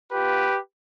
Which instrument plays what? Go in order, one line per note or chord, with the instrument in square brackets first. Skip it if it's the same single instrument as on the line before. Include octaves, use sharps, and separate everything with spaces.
[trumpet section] B3 F4 G4 B4